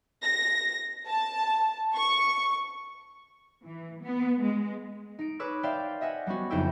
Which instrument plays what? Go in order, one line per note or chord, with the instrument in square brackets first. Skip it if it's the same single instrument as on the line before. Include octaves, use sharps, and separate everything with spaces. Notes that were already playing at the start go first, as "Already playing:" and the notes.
[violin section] A#6
A5
C#6
[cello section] E3
B3
G#3
[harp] D#4 D7
G#4 B4 C#5 D6 E6 F#6
C5 D5 E5 F5 G5
D#5 E5 F#5 G#5
G3 B3 C#4 F#4
F#1 F2 D#4 E4 G5 E6